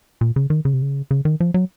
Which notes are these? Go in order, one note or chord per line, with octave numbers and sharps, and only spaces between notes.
A#2
C#3
D#3
C#3
C3
C#3
C#3
D#3
F3
F#3